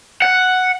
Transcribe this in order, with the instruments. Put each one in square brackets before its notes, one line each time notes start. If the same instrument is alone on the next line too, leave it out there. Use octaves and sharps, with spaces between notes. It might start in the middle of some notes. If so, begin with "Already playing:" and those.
[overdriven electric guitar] F#5